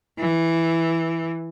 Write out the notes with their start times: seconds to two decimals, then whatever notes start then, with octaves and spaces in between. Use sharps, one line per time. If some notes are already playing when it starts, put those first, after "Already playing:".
0.18 E3